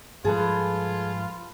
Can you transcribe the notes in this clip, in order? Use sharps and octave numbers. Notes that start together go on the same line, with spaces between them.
G#2 F3 G3 F4 G#4 A4 B4 A5